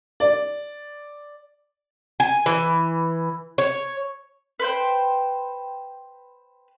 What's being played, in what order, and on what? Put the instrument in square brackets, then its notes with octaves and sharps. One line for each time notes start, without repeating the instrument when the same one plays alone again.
[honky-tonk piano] D5
[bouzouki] G#5
E3
C#5
[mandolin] B4 C5 G5